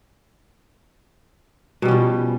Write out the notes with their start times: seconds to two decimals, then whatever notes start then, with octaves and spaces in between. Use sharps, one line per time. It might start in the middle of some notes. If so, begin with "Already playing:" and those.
1.82 B2
1.85 G3
1.88 C#4
1.91 F3